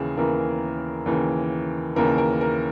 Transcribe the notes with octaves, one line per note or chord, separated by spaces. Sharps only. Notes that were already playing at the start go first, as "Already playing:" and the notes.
Already playing: D#2 C#3 E3 G#4
D#2 C#3 E3 A#4
D#2 C#3 E3
D#2 C#3 E3 A#4
A#4
A#4